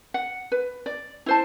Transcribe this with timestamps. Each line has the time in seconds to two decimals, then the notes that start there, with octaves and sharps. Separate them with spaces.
0.14 F#5
0.52 B4
0.86 D5
1.26 E4 C5 A5